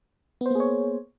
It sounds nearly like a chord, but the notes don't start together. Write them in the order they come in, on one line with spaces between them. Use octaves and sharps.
B3 C5 A#3 G#4 C#5